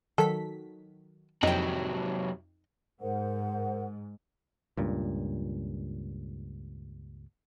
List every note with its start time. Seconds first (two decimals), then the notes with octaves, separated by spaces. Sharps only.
0.18 D#3 F#3 A4 B6
1.43 F2 C3 F#3 D#4 G5
3.01 G#2 A#4 C5 F#5
4.77 C#2 G2 A#2